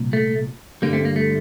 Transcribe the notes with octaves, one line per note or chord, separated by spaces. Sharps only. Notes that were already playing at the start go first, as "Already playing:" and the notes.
Already playing: C2 A#2
A3
G2 D3 G3 A#3
A3 C4
A#3
A3